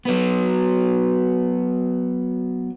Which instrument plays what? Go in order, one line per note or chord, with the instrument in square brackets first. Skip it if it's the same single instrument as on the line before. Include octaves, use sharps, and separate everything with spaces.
[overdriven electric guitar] F#3 B3